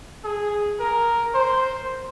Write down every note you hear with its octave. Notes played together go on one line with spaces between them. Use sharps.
G#4
A#4
C5